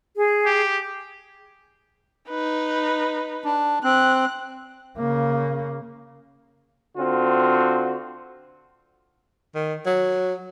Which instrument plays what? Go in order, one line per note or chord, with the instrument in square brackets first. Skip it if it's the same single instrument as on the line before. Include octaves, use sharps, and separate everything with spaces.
[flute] G#4
[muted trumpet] G4
[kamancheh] D#4 B4
[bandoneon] D4
[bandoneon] C4 [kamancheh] F#6
[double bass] C#3 A#3
[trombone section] D3 C4 F4 F#4
[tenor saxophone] D#3
F#3